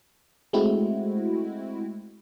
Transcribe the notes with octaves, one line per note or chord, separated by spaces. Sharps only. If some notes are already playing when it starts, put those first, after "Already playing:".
G#3 A3 C4 E4 F#4